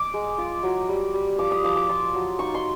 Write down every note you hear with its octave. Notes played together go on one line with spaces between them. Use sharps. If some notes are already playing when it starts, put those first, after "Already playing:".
Already playing: D6
G#3
F4
F#3
G3
G3
F3 D6
D#6
F3 D6
D6
F4 C6
F#3
D#4 C#6
C6